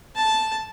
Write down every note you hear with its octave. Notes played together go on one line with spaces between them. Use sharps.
A5